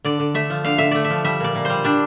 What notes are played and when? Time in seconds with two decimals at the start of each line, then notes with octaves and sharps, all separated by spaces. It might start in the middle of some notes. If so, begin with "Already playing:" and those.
0.05 D3 D5
0.20 D3
0.34 A3 E5
0.50 F3
0.64 D3 F5
0.78 D3 E5
0.91 A3 D5
1.04 E5
1.10 F3
1.24 G3 E5
1.40 A#2 D5
1.55 A#2
1.65 G3 C5
1.84 G3 D4